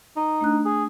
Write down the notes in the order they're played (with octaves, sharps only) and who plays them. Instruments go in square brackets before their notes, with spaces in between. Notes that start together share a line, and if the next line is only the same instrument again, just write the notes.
[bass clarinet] D#4
[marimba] A3 D4 F#6
[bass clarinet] G#4